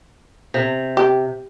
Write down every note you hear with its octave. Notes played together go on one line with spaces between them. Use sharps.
C3
G4